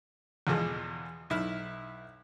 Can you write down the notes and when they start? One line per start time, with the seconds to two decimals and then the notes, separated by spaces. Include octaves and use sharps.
0.47 E2 B2 E3 F3 G#3
1.30 B1 E4 F6